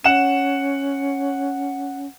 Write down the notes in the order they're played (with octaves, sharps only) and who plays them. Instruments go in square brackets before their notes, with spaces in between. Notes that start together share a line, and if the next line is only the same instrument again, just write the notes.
[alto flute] C#4 [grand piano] F#5 E7